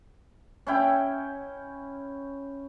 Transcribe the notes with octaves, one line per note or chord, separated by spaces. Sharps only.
C#4 E4 G5